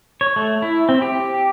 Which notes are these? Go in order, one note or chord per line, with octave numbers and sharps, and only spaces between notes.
C#5
A3
E4
C4
G4